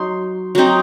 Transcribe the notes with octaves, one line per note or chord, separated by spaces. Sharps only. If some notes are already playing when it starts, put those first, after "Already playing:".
Already playing: F#3 D#4 C6
F#3 C4 D#4